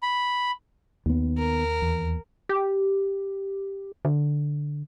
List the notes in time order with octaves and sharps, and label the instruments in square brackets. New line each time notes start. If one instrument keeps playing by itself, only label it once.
[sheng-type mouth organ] B5
[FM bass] D#2 [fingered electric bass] D#3 B3
[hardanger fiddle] A#4
[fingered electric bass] E2
[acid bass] G4
[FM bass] D3